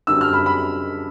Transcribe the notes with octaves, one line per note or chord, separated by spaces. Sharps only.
F#2 D3 G3 C4 E6
F6
B5
B5